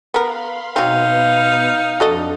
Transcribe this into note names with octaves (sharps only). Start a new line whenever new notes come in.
B3 A#4 F5 B5 C6
B2 F#3 C4 D#4 B4 F5
F2 D4 F#4 A4 D#5